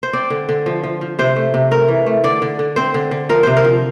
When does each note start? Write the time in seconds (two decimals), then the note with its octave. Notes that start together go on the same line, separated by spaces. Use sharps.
0.03 C5
0.13 C4 D5
0.30 D3
0.49 D3
0.66 F3
0.84 F3
1.01 F3
1.19 C3 C5
1.36 A3
1.54 C3
1.71 A3 A#4
1.88 E3
2.06 A3
2.24 D3 D5
2.42 D3
2.59 D3
2.76 C4 C5
2.94 D3
3.11 D3
3.29 F3 A#4
3.43 C3 C5
3.57 A#4
3.65 F3